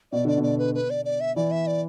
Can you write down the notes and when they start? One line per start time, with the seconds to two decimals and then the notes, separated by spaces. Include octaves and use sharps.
0.12 B2 D5
0.25 D3 D5
0.38 B2
0.43 D5
0.59 B4
0.75 B4
0.90 D5
1.05 D5
1.21 E5
1.36 E3 D5
1.51 E5
1.67 D5